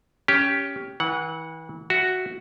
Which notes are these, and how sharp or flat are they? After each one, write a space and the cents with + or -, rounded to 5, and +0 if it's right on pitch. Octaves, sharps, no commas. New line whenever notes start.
C#4 +15 G4 +0
E3 -35 F#5 +0
F#4 +0 E5 +0